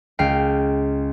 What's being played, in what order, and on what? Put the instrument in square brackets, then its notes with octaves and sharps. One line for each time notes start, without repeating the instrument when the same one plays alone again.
[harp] C#2 F5 G5